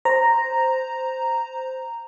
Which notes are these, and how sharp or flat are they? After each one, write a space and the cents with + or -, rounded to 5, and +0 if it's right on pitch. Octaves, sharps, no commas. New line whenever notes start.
C5 -5 A#5 +0